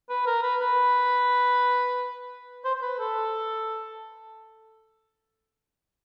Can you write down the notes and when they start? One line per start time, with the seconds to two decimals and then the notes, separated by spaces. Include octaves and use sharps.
0.09 B4
0.26 A#4
0.42 B4
0.60 B4
2.65 C5
2.75 C5
2.82 B4
2.99 A4